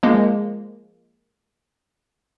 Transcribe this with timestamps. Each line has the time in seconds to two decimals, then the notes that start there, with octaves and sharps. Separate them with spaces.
0.03 F3 G#3 A#3